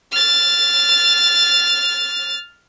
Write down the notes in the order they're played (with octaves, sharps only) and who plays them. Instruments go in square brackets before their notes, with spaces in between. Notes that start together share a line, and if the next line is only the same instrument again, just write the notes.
[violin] F6 A6